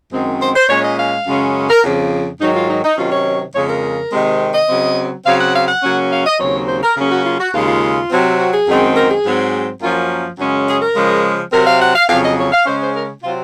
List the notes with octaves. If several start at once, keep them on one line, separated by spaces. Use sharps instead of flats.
F#2 D#3 G#3 C4
C5
C5
A#2 G#3 C#4 C#5
D#5
F5
F#2 C#3 G#3 C#4
A#4
F2 C#3 F3
G#2 D#3 F#3 D#4
F4
D#4
D#4
C3 D#3 F#3 C#4 F4
C#5
F2 C#3 G#3 C#5
A#4
C3 D#3 G#3 C4
D#5
C#3 F#3 C4
C#3 F#3 C4 F5
F#5
F5
F#5
C#3 F#3 A#3 C#4
F5
D#5
D#2 C#3 F#3 C4 C#5
C5
A#4
C#3 F#3 A#3 C#4 G#4
F#4
F4
F#4
D#2 C#3 G#3 F4
F4
C3 F#3 C4
F#4
G#4
F#2 D#3 G#3 C4
A#4
G#4
G#2 F#3 C4
F#2 F3 A#3 C#4 F4
F#2 C#3 G#3 C#4
G#4
A#4
C#3 F3 G#3 C#4
C3 F#3 C4 A#4
F5
F#5
F5
F2 C#3 F#3 F5
D#5
C#5
F5
C#3 G#3 C#4 C5
C5
A#4
C3 F#3 C4 F4